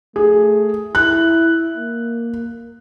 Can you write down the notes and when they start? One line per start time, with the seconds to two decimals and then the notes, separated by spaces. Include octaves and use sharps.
0.16 A3 G#4
0.95 E4 F#6
1.77 A#3